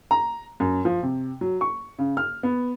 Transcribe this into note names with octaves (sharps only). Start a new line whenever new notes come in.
A#5
F#2
F3
C3
F#3
C#6
C#3
F6
B3